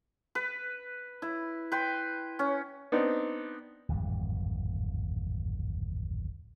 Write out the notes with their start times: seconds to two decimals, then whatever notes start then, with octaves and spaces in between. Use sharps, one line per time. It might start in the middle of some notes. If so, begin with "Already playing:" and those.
0.35 B4
1.22 E4
1.72 B4 G5 C6
2.39 C#4
2.92 B3 C4 D4 D#4
3.89 D1 G#1 F2 G3